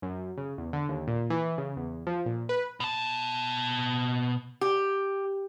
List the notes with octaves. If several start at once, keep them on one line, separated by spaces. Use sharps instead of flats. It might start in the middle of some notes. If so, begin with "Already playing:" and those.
F#2
C#3
E2
D3
D#2
A#2
E3
C#3
E2
F3
A#2
B4
B2 A5
G4